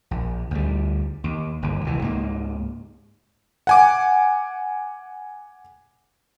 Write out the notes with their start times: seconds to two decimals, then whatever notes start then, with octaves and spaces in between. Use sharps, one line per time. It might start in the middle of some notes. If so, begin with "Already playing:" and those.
0.11 A#1
0.51 D2 G3
1.24 D#2
1.62 G1 D#2
1.84 C2 E3
2.00 C#2 G#2 A#3
3.67 F#5 G#5 D6